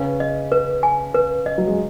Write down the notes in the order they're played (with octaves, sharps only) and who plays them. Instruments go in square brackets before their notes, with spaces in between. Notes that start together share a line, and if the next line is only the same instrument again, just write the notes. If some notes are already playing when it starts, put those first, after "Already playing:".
Already playing: [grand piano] C#3 C#4 [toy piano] B4
[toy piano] D#5
B4
G#5
B4
D#5
[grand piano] F#3
G#3